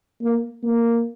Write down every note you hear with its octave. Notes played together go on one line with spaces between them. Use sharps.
A#3
A#3